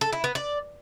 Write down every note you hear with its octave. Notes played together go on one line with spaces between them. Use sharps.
A4
E4
B3
D5